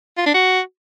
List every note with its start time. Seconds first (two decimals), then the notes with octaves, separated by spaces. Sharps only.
0.18 F4
0.26 D4
0.34 F#4